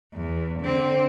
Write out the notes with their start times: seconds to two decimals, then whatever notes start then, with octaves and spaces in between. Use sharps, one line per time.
0.14 E2
0.60 D3 C4